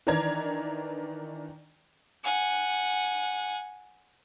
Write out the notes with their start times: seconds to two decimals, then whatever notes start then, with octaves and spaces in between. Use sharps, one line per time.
0.07 D#3 E3 D4 D5 A#5 G#6
2.24 F#5 G#5